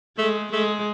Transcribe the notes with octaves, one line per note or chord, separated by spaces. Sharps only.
G#3 A3
G#3 A3